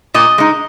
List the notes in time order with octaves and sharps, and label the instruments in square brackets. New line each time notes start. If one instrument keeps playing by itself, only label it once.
[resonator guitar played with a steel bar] A#2 D#5
G#3 D#4